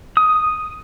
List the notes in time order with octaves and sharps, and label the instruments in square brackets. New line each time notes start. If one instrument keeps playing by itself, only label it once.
[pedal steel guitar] D#6